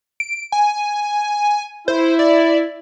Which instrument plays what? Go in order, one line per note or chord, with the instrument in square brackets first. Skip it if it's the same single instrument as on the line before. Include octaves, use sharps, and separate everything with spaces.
[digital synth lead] D7
G#5
[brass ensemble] E4 [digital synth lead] C5
[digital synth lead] D5